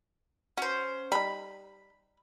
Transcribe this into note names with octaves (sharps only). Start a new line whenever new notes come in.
C#4 F#4 C5
G3 D#4 B5